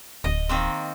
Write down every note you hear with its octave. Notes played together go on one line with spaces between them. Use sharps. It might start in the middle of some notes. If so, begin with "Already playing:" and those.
D1 D#5
D#3 A#3 C4